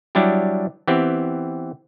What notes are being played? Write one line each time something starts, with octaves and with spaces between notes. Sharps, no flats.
F#3 G3 D4 E4 G4
E3 B3 C4 G4